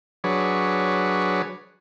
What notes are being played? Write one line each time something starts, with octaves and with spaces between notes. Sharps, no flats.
F#3 D4 G#4 B4 C#5